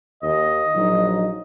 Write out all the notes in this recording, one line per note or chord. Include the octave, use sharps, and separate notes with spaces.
D#2 D#5
A#1 F#3 D#4